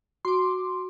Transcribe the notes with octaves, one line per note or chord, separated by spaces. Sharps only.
F#4 C6 D6